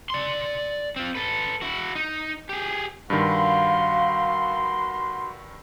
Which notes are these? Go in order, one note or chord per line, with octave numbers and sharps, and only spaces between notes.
D5 C6
C4 F4
A4 B4
E4 F#4
D#4
G4 G#4
G2 D#3 F#4 F5 B5 C6